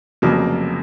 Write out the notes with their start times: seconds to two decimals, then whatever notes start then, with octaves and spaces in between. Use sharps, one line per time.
0.22 F1 F2 C#3 F#3 A#3